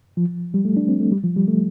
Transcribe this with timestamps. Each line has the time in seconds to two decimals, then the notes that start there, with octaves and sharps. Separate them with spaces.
0.17 F3
0.54 G3
0.65 A3
0.77 D4
0.88 C4
1.00 A3
1.12 G3
1.24 F3
1.36 G3
1.48 A3